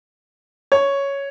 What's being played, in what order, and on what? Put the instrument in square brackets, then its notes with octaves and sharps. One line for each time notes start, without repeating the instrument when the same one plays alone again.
[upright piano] C#5